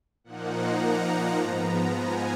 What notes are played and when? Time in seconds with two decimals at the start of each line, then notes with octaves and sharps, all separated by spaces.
0.24 A#2 F3 A#3 D#4 F#5
0.52 A#5
0.81 A#5
1.37 G#2 F3 B3
1.94 G#5